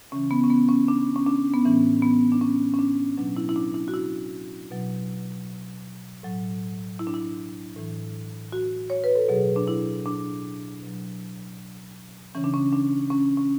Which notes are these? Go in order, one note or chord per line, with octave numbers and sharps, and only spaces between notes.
C#3 E3 C#4
B3
C#4
B3
C#4
D4
C#4
D4
B3
A2 E3 C#4
B3
D4
C#4
C#4
D4
B2 F#3 D4
E4
E4
D4
E4
F#4
E4
B2 F#3
A2 F#3
E4
D4
E4
A2 E3
F#4
C#5
B4
A4
B2 F#3 G#4
D4
E4
D4
B2 F#3
C#3 E3 C#4
D4
C#4
D4
C#4
C#4